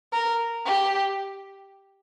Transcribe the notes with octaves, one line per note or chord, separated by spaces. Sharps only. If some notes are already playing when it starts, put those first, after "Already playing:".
A#4
G4